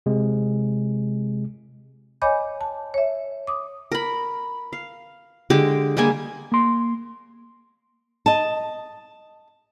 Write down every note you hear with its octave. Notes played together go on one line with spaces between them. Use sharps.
C3 G#3
C#5 D#5 G#5 B5 D6 G6
A5
C#5 E5
D6 D#6
A#4 B5
F5
D3 G#3 G4 D6
G3 G#3 A#3 G#5
A#3 C6
D#5 A5